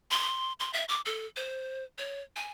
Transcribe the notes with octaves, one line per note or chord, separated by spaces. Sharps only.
C6
C6
E5
D6
A4
C5
C#5
G#5